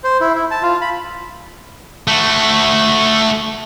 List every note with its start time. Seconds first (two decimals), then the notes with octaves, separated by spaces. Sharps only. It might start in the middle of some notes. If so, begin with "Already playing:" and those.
0.04 C5
0.21 E4
0.35 E4
0.51 A5
0.63 F4
0.81 B5
2.08 A3 F#4